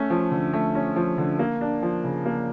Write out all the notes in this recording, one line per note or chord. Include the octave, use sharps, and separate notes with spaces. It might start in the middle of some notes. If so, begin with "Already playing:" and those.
Already playing: A3 C#4
F3
D3
A3
C#4
F3
D3
A#3
D4
F3
C#3
A#3